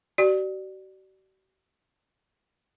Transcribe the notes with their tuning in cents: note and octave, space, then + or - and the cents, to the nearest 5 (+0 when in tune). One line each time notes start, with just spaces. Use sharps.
F#4 +45 D5 +15